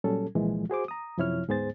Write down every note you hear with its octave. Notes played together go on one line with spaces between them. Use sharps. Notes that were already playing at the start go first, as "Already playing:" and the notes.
A#2 F#3 G3 C#4 A4
C2 A#2 E3 F3 G#3
F#4 G#4 C5 D6
A#5 D#6
F#2 C3 F3 E4 C#5 F6
D2 G#2 B3 G#4 C5 A6